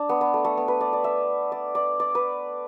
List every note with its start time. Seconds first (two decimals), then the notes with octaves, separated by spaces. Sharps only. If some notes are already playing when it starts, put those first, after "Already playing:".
Already playing: D4
0.09 B3
0.21 B3
0.34 A3
0.45 A3
0.57 B3
0.68 B4
0.81 D5
0.93 D5
1.04 E5
1.52 D5
1.75 D5
2.00 D5
2.15 B4